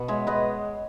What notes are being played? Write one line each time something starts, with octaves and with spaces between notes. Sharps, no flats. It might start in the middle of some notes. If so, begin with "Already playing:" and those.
Already playing: B2 B4
G#3 C#5 E5
G#3 B4 D#5